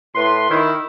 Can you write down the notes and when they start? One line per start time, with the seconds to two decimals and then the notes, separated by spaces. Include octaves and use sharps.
0.15 A2 B4 C6
0.50 D#3 E4